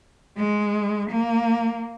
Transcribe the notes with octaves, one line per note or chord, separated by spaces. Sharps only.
G#3
A#3